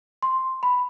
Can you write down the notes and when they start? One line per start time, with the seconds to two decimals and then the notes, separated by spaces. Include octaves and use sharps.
0.23 C6
0.63 B5